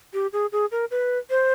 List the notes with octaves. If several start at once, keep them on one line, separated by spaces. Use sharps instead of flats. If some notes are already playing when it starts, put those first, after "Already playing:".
G4
G#4
G#4
A#4
B4
C5